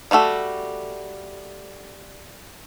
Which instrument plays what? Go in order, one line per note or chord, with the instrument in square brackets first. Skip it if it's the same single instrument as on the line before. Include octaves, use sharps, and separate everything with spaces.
[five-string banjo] G3 A3 F#4 A4